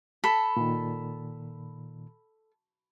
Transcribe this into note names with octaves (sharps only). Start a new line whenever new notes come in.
A4 B5 B6
A#2 D#3